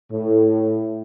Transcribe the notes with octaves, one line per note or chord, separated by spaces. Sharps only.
A2